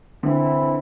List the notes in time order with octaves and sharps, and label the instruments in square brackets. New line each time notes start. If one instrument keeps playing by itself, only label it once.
[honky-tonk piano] D3 [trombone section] E3 C4 E4